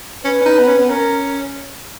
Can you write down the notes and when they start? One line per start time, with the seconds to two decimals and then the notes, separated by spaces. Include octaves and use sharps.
0.24 C#4 B4
0.41 C#4
0.46 D#4
0.59 B3
0.67 C#4
0.79 B3
0.89 C#4 A#4